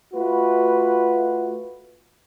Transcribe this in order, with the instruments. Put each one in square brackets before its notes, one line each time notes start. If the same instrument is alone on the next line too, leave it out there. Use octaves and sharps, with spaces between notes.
[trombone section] A3 F4 F#4 B4